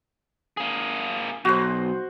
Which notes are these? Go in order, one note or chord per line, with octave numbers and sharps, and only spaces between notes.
A#3 G#4
B1 F#4 C5